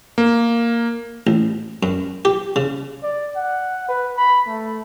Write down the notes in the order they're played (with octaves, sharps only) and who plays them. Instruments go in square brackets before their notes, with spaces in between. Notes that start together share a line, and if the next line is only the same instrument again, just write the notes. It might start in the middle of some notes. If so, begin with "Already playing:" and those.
[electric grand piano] A#3
[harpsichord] A1
F#2
G4
C#3
[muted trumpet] D5
F#5
B4
B5
A3